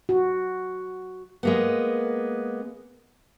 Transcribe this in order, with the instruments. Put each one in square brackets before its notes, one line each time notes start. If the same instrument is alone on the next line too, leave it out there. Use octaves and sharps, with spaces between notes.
[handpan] F#4
[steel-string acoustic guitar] G#3 A#3 B3